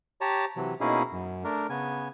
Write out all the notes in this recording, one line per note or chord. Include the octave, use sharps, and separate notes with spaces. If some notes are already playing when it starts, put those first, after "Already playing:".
G4 C#5 A5 A#5
C3 E3 F#3
B2 A#3 C#4 D#4 E4 G#4
F#2
A3 D4 A#4
C#3 B3 G#5